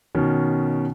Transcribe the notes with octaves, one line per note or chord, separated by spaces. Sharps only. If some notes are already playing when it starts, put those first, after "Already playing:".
B2 D#3 C#4